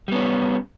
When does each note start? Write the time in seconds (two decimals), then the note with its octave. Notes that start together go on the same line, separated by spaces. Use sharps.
0.08 G3
0.12 B3
0.15 C#4